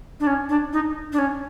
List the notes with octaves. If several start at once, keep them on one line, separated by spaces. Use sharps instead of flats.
D4
C#4
D4
D#4
D4
C#4